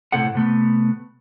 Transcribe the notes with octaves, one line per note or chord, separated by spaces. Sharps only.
A2 C3 C4 A4 F#5
C3 A3 B3